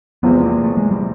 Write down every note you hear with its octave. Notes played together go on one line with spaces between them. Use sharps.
E2 C3 F3 G#3 B3 C4
A#3
A3
G#3
G3